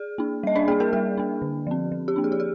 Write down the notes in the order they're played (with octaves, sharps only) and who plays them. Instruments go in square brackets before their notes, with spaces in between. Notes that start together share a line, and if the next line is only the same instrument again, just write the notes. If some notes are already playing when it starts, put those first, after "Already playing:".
Already playing: [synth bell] G#4
A#3 D4
G3 D#5
D4 D5
A#3 D4 G#4
A#3 A#4
G3 G#4
A#3 D4
D3
F3 C4
F3
G4
A#3 D4
G#4
G4
G#4